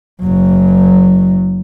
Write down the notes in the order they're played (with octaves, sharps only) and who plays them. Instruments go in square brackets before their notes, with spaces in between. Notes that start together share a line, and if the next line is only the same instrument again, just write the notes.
[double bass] F#1 F#3